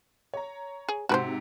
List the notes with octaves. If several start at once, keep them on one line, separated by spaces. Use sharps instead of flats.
C#5 A#5
G#4
G#2 C3 F#4 B4 C5